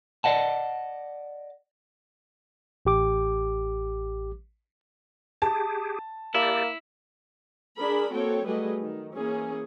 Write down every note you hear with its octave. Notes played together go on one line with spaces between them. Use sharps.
D5 D#5 F#5 A5
A1 G4 D6
G4 G#4 A5
A#3 E4 G4 D5
D4 G#4 A#4 B5
A#3 C4 F#4 A4 C#5 G5
F#3 G3 A3 G#4 B4 D#5
D#3
E3 A#3 C#4 G#4